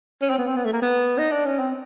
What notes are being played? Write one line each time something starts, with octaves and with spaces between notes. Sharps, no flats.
C#4
C4
B3
C4
B3
A3
A#3
B3
D#4
D4
C#4
C4